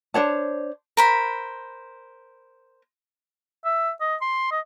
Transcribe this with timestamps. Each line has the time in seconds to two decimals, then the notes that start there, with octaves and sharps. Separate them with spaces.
0.14 D4 C5 C#5 A5
0.97 A#4 C5 B5
3.64 E5
4.01 D#5
4.21 C6
4.52 D#5